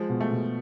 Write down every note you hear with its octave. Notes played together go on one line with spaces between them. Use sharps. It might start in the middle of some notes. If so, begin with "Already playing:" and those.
Already playing: F3 G#3
B2
A3
B2